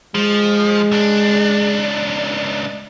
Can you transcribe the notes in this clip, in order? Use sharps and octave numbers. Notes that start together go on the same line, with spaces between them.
F3 G#3
C#2 D4